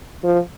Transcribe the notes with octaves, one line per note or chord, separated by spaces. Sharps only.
F3